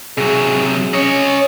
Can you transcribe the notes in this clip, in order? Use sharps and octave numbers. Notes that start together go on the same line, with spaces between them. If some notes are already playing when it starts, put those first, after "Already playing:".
C3 F#3 G#4
C#4 C#5 D#5